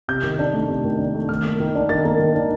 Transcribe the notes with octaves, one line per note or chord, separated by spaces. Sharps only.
C3 G6
D#3
D4
A3
C3
D#3
D4
A3
D#3 F6
A#3
D#3
D4
D#3 A6
A#3
D#3
D4